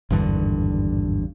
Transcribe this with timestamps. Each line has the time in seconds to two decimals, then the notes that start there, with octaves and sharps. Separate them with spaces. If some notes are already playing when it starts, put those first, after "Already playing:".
0.10 G#1 E2 G2 D3